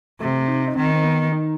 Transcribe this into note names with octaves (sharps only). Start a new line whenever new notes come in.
C3 A3
D#4
D#4
D#3 C4
C4
B3
D#4